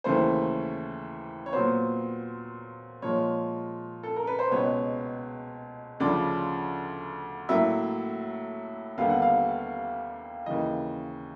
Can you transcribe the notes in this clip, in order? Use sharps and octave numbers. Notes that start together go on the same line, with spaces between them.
D#2 C#3 E3 A3 C5
C#5
A#2 F#3 B3 C5
A#2 F3 G#3 C#5
A4
A#4
B4
C5
C#2 B2 G#3 B3 C#5
D2 C#3 F3 D5
A2 F#3 A#3 E5
D#2 D3 G3 B3 F5
F#5
F5
D#2 C#3 E3 D#5